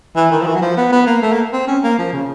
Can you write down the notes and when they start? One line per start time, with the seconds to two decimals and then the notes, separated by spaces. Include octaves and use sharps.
0.16 E3
0.32 D#3
0.42 F3
0.46 E3
0.56 F#3
0.61 F3
0.77 B3
0.92 B3
1.07 A#3
1.22 A3
1.33 A#3
1.53 C4
1.68 C#4
1.83 A#3
1.98 F3
2.13 C#3